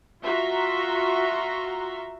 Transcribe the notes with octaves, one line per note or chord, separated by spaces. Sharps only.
F4 F#4 E5 A#5 C6